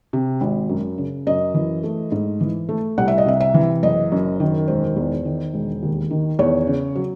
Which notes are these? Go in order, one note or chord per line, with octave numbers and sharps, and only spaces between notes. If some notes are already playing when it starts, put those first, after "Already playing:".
C3
G#1
F#2
C#3
F#2 D#5
E3
A3
G#2
E3
A3
C2 F#5
E5
D#5
C3 E5
E5
E3
F#1 D#5
F#2
D#3
E1 C5
E2
D#3
E1
D#2
D#3
E2 C#5
C#3
F#3